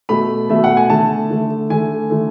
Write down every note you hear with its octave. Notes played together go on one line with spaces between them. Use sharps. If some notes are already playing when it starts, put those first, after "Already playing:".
B2 A3 B5
B2 A3 E5
F#5
G#5
D3 A3 A5
D3 A3
D3 A3 G#5
D3 A3